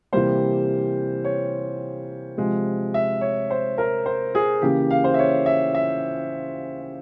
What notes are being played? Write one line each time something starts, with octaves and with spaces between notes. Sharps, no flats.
C3 E3 G3 A#3 C5
C#5
C3 F3 G#3
E5
C#5
C5
A#4
C5
G#4
C#3 E3 A#3 G4
F5
C5
E5
C#5
E5
E5